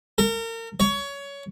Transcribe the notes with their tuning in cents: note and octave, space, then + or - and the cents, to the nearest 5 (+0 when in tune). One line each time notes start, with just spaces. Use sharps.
A#4 -35
C#5 +20